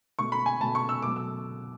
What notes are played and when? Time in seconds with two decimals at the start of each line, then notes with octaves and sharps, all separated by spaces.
0.19 B2 A3 C#6
0.32 B5
0.46 G#5
0.60 B2 A3 A5
0.75 C#6
0.89 E6
1.02 B2 F#3 A3 D6
1.16 E6